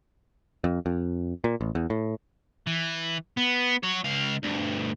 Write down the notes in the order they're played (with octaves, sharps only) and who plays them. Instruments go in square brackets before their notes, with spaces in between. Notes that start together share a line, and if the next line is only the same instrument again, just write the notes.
[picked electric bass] F2
F2
A#2
A1
E2
A2
[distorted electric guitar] E3
B3
F#4 C#5
C#2 F5
D2 G2